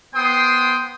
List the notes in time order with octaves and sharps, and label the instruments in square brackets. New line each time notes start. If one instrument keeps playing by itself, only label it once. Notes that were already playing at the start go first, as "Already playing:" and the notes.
[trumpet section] B3 C5 G5 C6 D#6